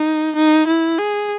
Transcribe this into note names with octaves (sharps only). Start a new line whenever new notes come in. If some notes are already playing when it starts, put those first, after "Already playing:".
Already playing: D#4
D#4
E4
G#4